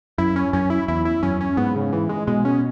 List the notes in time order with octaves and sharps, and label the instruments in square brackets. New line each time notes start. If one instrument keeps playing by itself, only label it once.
[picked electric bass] F#2 [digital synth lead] E4
[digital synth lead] C#4
[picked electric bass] F#2 [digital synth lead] C#4
[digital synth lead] E4
[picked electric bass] E2 [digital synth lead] E4
[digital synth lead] E4
[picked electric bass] F#2 [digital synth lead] C#4
[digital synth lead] C#4
[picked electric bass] G#2 [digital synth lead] B3
[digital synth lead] C#3
E3
G#3
[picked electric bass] B2 [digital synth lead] G#3
[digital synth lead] C#4